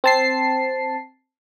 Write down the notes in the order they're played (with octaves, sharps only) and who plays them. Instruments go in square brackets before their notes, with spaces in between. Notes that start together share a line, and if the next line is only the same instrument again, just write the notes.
[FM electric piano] C4 A5 C7